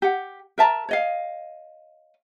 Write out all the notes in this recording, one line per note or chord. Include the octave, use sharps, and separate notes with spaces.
G4 F#5
A#4 E5 A5 A#5
C#5 D#5 F5